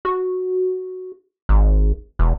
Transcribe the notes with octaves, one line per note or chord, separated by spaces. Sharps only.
F#4
G#1
E1